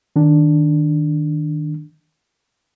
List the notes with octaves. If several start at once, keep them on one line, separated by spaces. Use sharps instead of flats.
D#3 D4